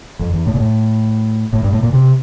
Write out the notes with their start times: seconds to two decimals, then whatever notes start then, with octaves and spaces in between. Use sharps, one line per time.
0.19 F2
0.33 E2
0.46 A2
0.54 A#2
0.59 A2
1.53 A2
1.63 G2
1.72 A2
1.82 A#2
1.93 C3